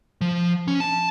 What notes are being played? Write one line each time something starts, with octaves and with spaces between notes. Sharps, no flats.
F3
C#4
A5